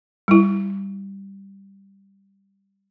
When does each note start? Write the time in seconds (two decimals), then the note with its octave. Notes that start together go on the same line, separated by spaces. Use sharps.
0.28 G3 E4